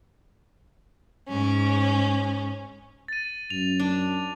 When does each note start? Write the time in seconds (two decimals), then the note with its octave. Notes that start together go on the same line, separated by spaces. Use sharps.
1.26 G#2 C#4
3.08 A6 D#7
3.50 F#2 F7
3.80 D4